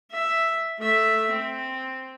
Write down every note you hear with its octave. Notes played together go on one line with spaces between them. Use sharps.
E5
A3 E5
C4